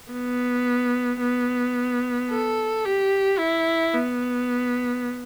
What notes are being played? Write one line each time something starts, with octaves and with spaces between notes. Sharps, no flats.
B3
B3
A4
G4
E4
B3